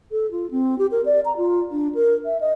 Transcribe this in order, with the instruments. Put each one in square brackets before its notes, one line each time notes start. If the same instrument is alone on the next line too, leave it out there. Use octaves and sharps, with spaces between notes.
[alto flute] A4
F4
C4
G4
A#4
D5
A#5
F4
D4
A#4
E5
D#5